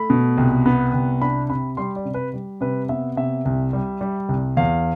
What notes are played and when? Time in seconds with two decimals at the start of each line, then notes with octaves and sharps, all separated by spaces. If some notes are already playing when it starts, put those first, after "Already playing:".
Already playing: A3 B5
0.10 B2
0.38 C2
0.66 B3
0.94 C2
1.21 D4 B5
1.50 C3 B5
1.77 G3 C6
1.96 D5
2.05 C3
2.14 B4
2.34 G3
2.61 C3 B4
2.89 B3 E5
3.17 C3 E5
3.45 C2
3.73 G3
4.01 G3
4.29 C2
4.57 E2 F5